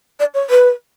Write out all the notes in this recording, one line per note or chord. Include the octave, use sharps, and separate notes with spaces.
D5
C#5
B4